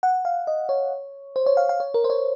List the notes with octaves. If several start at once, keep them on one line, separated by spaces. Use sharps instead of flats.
F#5
F5
D#5
C#5
C5
C#5
F5
F5
C#5
A#4
C5
C#5